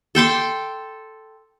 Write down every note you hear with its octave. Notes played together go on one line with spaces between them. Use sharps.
A4 G5 C6 D6